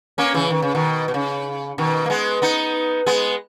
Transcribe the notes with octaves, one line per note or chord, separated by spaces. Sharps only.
A#3 C#4
C#3 E3
D#3
C#3
B2 D#3
B2
C#3
B2 D#3
A#3
G#3 B3
B3 D#4
G#3 B3